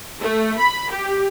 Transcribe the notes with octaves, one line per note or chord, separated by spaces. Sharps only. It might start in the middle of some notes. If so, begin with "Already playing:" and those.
A3
B5
G4